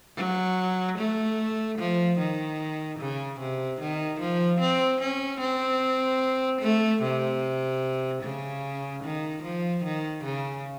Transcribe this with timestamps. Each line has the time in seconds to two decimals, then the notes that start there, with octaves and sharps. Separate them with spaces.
0.16 F#3
0.98 A3
1.79 F3
2.18 D#3
2.99 C#3
3.40 C3
3.80 D#3
4.20 F3
4.60 C4
5.00 C#4
5.40 C4
6.61 A3
7.02 C3
8.22 C#3
9.04 D#3
9.43 F3
9.84 D#3
10.24 C#3